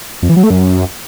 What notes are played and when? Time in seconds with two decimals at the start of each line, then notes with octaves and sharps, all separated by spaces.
0.23 F2
0.30 E3
0.36 F#3
0.43 A3
0.50 F#2